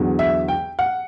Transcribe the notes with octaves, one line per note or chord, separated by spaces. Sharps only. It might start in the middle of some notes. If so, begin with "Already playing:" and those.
Already playing: E2 D3 F#3
E5
G5
F#5